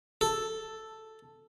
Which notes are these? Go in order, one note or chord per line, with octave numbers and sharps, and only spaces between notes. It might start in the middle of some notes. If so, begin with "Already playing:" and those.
A4